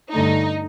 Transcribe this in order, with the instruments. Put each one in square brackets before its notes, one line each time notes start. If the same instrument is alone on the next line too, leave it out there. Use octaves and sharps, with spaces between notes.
[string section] G2 D3 A3 D#4